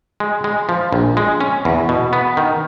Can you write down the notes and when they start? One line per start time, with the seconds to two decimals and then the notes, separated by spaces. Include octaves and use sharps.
0.20 G#3
0.44 G#3
0.69 F3
0.93 A#1
1.17 G#3
1.41 C#4
1.65 E2
1.89 B2
2.13 B3
2.37 D#3